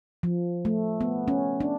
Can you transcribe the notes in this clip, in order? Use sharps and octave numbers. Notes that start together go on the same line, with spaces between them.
F3
A3
B3
C#4
D4